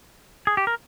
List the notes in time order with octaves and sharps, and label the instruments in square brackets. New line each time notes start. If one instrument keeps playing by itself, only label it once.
[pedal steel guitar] G#4
G4
A#4